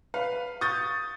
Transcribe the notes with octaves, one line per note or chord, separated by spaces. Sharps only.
B4 F5
C#6 D#6 G6 A6